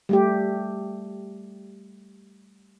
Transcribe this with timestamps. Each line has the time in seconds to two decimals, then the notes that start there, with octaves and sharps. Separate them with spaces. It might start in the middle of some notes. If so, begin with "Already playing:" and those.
0.09 G3 A3 G4